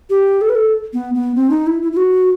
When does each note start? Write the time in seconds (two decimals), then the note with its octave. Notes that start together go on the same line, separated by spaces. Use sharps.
0.10 G4
0.41 A4
0.49 B4
0.55 A4
0.93 B3
1.14 B3
1.35 C4
1.50 D#4
1.67 E4
1.82 E4
1.92 E4
1.97 F#4